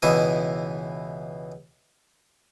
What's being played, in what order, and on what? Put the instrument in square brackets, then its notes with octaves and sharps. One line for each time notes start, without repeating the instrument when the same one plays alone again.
[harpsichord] C#2 B2 E3 E4 D#6